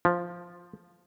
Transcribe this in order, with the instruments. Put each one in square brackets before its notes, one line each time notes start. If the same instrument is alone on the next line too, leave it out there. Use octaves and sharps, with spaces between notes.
[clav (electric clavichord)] F3